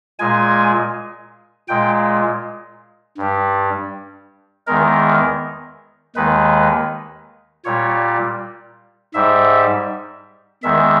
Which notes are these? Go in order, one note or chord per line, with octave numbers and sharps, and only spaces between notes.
A#2 G#3 G#5
A#2 G#3 G5
G2 G3
E2 D#3 G#3 A#4
D#2 D#3 G#3 B4
A#2 G3 C#5
G#2 G3 E5
E2 D#3 G#3 E5